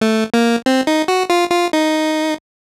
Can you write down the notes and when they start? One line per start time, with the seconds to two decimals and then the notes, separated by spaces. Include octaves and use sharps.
0.01 A3
0.34 A#3
0.66 C4
0.87 D#4
1.08 F#4
1.30 F4
1.51 F4
1.73 D#4